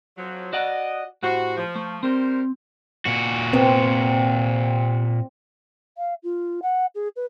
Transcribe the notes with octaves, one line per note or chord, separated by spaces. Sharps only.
F2 F3 F#3
F#4 D5 D#5 F#5
A2 F#4 G4 C5
F3
A3
G3 C4 A#4 C5
A#2 F#4
C3 B3 C4
F5
F4
F#5
G#4
B4